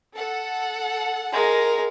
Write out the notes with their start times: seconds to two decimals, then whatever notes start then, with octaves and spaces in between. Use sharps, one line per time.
0.16 A4 F#5
1.33 G#3 A#4